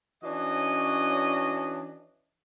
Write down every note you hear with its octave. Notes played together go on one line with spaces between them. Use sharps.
E3 C#4 D4 F#4 C#5 D#5